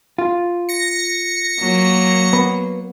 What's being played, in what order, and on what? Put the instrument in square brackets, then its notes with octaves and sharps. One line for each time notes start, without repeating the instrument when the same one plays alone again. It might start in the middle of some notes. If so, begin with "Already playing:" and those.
[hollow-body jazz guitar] F4
[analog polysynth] A#6 C#7
[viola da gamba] F#3 A#3
[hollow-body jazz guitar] B3